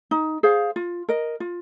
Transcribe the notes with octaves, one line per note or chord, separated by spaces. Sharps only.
D#4
G#4 C5 F5
F4
A#4 D#5
F4